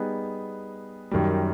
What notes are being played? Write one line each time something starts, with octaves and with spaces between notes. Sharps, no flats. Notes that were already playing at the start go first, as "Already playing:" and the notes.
Already playing: G3 B3 D#4 G#4
F#2 D#3 G3